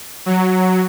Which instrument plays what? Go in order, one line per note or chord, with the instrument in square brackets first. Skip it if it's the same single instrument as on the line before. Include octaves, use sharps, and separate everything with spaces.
[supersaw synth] F#3